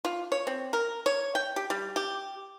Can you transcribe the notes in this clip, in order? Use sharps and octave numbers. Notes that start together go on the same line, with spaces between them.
F4
C#5
C4
A#4
C#5
G5
G4
G3
G4